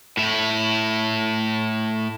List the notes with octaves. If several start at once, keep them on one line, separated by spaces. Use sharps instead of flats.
A2 E4